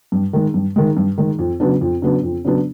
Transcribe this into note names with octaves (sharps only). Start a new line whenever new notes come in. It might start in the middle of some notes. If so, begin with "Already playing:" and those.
G2
D#3 G#3
G2
D#3 G#3
G2
D#3 G#3
F2
C#3 F#3 B3 D4
F2
C#3 F#3 B3 D4
F2
C#3 F#3 B3 D4